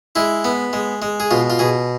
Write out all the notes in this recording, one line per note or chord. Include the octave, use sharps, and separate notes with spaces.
G#3 E4
B3
G#3
G#3
G#4
B2 F4
F4
B2 G#4